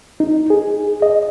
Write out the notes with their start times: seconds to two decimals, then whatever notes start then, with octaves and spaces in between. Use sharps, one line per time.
0.20 D#4
0.50 G#4
1.02 D#5